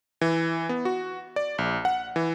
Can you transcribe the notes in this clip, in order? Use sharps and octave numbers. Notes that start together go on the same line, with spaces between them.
E3
B3
F#4
D5
A#1
F#5
E3